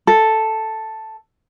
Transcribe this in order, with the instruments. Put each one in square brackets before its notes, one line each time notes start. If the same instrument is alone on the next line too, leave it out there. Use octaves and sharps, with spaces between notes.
[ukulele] A4